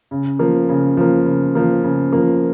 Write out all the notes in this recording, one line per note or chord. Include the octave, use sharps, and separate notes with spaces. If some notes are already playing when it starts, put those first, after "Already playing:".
C#3
F3 A#3
C#3
F3 A#3
C#3
F3 A#3
C#3
F3 A#3